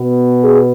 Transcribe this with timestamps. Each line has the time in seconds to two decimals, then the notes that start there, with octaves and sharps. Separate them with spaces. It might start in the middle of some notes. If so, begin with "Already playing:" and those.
Already playing: B2 B3
0.43 G#4